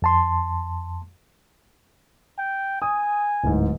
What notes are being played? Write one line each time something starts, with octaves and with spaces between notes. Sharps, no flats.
F2 A5 C6
G5
G#5 D#6
D1 G#2